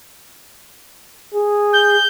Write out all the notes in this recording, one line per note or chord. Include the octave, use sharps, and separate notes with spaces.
G#4
G6